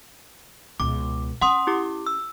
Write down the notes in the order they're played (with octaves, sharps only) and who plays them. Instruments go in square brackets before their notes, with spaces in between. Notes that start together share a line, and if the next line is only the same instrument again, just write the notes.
[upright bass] C#2 B2 [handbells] D6
[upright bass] C#4 [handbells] F#5 C6 D#6
[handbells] E4 G4 D6
E6